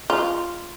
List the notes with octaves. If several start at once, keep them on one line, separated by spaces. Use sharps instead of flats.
F4